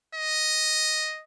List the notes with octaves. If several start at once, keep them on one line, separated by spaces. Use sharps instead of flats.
D#5